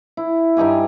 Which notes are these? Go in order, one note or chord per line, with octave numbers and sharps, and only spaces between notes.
E4
G2 D#4 G4 G#5